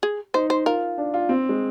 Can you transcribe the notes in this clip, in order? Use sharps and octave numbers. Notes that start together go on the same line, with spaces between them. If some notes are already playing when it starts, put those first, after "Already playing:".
G#4
D#4 C5
C5
F4 A#4
D4
F4
C4
G#3